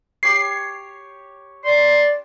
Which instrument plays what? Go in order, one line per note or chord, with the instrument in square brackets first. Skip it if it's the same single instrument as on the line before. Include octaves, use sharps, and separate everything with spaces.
[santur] G4 C#5 [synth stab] C7
[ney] D5 [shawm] C6